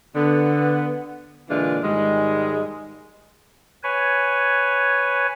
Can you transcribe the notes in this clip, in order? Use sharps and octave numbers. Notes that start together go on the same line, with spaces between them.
D3 B3
A#2 D3 E3 G#3 D4 F4
G#2 D#3 G3 G#3
B4 C#5 G#5